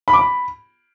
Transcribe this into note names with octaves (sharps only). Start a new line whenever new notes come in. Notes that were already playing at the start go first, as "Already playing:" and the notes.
B5
D6
B5